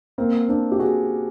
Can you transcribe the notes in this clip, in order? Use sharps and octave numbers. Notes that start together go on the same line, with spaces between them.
A#3 C4
C4 D4
G4
F#4 G#4